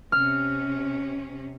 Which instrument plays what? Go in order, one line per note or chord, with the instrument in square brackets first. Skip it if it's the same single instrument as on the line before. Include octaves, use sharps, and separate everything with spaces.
[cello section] C3 C#4 [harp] F6